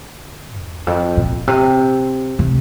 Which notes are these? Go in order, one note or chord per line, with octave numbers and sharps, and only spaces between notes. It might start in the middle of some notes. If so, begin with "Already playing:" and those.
Already playing: D3
E2
F2
A#2
C3
C3